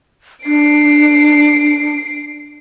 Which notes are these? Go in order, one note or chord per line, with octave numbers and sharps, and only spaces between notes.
D4 C7 D7